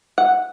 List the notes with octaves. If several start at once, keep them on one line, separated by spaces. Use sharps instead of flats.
F#5